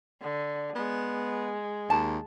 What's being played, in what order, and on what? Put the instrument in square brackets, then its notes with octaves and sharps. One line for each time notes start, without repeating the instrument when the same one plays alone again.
[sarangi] D3
[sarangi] G#3 [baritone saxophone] B3
[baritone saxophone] D#2 [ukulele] A5